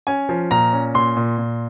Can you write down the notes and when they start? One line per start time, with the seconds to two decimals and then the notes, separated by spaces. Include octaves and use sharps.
0.07 C#4 G#5
0.29 F3
0.51 A#2 A#5
0.73 C#4
0.94 A#2 C6
1.16 A#2
1.38 A#2